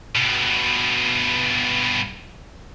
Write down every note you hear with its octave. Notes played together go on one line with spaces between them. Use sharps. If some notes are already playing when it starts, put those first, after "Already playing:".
G2 B2